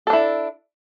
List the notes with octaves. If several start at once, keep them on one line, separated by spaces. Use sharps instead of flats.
D4 E4 A4